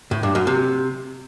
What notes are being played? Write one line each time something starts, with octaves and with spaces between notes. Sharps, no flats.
A2
G2
F#2
C3